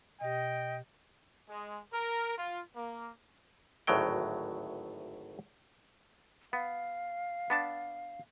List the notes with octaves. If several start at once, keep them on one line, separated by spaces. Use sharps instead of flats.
B2 G4 D#5 G5
G#3
A#4
F4
A#3
G#1 D2 A2 F#3 G5
B3 F5
B3 D4 A5